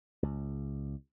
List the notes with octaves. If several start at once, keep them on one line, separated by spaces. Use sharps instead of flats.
C#2